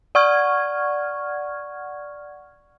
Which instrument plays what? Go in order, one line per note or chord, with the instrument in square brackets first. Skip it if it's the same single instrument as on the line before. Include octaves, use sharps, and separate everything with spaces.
[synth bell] D5 F#5 C#6 F6 G#6